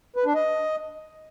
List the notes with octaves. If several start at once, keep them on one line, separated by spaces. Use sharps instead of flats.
B4
D4
D#5